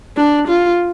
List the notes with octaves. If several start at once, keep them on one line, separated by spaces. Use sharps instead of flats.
D4
F4